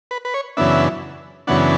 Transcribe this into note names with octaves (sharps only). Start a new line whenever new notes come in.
B4
B4
C#5
F#2 C#3 E3 B3 D4 E5
F#2 C#3 E3 B3 D4 F#5